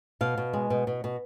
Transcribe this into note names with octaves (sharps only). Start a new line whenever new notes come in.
B2 F5
B2
G#3
B2
B2
B2